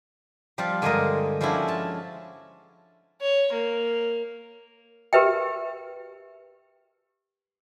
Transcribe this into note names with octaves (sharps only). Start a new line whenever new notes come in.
F3 G3 C4 F4 F5
G2 D3 G#3 F4 A#4 D#5
F3 G#3 C#4 D4 E4 F#4
F4 A5
C#5
A#3
G4 A#4 B4 E5 G5